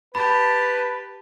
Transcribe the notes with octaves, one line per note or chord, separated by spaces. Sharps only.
G4 B4 A5 B5